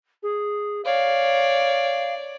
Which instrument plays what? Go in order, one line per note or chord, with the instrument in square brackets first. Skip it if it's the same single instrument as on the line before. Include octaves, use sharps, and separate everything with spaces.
[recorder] G#4
[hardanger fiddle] C#5 D5 [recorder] F5